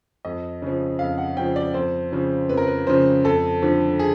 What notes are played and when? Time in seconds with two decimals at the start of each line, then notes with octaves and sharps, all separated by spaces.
0.25 F2 D#5
0.62 C#3 F3
0.99 F2 F5
1.18 F#5
1.37 C#3 G5
1.39 F3
1.56 D5
1.74 F2 C5
2.12 C#3 F3
2.49 F2 B4
2.57 A#4
2.67 B4
2.87 C#3 F3 C5
3.24 F2 A4
3.62 D3 F3
3.99 G#4